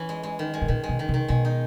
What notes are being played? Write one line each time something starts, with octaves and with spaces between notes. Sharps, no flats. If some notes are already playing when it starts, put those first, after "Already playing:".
Already playing: E3 C#4
G#3
G#3
D#3
G#3
A2
A#2 D#3
G#3
B2
D#3
C3
D#3
B2 G#3
D#4